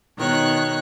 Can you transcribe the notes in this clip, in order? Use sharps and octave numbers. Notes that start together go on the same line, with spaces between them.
B2 D#3 C#5 F#6